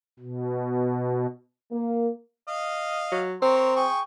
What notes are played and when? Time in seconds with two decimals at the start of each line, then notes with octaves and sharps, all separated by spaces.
0.19 B2
1.72 A#3
2.48 D#5 F5
3.11 F#3
3.42 C4 A#4 C#5 C6
3.76 G#4 G5 C#6